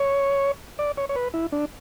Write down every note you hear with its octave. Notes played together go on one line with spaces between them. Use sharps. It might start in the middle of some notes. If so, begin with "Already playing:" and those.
Already playing: C#5
D5
C#5
C#5
B4
E4
D4